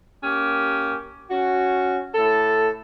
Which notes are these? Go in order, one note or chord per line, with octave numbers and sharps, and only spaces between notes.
A#3 C#4 G4
C#4 F#4
A2 A4